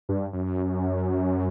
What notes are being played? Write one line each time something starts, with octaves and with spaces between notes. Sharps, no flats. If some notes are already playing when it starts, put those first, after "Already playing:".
G2
F#2